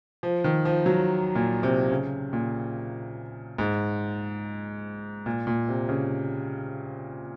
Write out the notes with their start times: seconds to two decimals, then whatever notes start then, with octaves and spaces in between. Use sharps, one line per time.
0.23 F3
0.44 D#3
0.65 F3
0.86 F#3
1.35 A#2
1.63 C3
1.91 C#3
2.33 A#2
3.58 G#2
5.26 A#2
5.47 A#2
5.68 C3
5.89 C#3